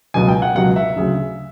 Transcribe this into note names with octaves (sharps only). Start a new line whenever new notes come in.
C#2 B2 F#3 G#5
G5
F#5
C#2 B2 F#3 F#5
E5
D2 C#3 F#3